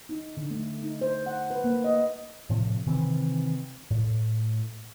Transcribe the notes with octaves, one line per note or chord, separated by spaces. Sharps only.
D#4
D3
A3
D#4
C5
F#5
B4
A#3
D#5
A2 C3 F3
C3 D#3 E3 C4
A2